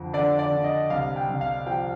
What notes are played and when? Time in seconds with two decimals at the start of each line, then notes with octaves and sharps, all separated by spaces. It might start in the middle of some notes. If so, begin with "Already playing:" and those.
Already playing: F2 D3
0.13 D3 D5
0.39 D5
0.51 D3
0.64 D#5
0.90 C2 F5
1.16 G5
1.28 C2
1.41 F5
1.66 F3 G5